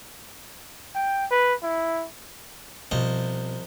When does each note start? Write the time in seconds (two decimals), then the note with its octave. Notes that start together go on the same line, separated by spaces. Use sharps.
0.94 G5
1.31 B4
1.63 E4
2.91 C2 B2 F3 D#5